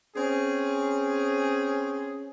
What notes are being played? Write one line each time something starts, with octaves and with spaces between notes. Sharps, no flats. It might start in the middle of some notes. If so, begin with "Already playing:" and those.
C4 C#4 G#4